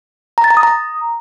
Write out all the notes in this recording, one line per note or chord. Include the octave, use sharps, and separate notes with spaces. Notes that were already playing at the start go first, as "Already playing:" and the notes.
A#5
A6
A#5
D#6
A#5